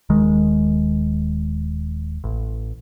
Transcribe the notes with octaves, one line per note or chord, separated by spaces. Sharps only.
D#1 D#3 G#3
A1